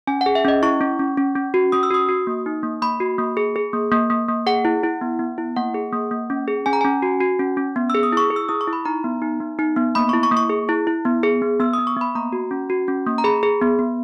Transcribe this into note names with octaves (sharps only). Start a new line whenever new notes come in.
C#4 G#5
F#5
G#4
E5
C#4 D#5
E4 C#6
C#4
C#4
C#4
C#4
F#4
C#4 D#6
E6
F#4 D#6
F#4
A#3
D#4
A#3
A#3 B5
F#4
A#3
G#4
G#4
A#3
A#3
A#3
A#3
G#4 F#5
E4
E4
B3
B3
E4
A#3 F#5
G#4
A#3
A#3
C#4
G#4
C#4 G#5
A#5
C#4 G#5
F#4
F#4
C#4
C#4
B3
G#4 E6
D#6
E4 C#6
G#4
E6
E4 D#6
C#6
E4
B5
D#4 A#5
B3
D#4
B3
D#4
B3
A#3 B5
E4 C#6
C#6
A#3
C#6
G#4
E4
E4
B3
G#4
B3
B3 E6
B3 D#6
C#6
B3 B5
A#3 A#5
F#4
C#4
F#4
C#4
A#3
A#5
G#4 B5
G#4
B3
B3